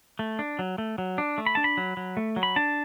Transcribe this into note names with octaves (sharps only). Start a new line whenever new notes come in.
A3
D4
F#3
A3
F#3
D4
A3
B5
D4 A5
B5
F#3
F#3
A3
F#3
B5
D4 A5